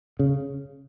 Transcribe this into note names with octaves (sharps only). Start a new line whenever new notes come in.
C#3